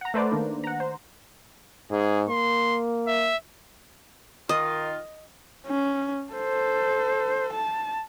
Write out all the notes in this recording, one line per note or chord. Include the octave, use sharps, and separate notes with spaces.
F#5 A#5
A3 B4 C5 D5
D#3 A#3 D4
F#5 A#5
C5
G#2 G#4
A#3 C6
E5
D#3 F4 D#5
C#4
A4 C5
A5